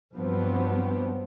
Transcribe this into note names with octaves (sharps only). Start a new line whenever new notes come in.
G2 F3 F#3 B3 C4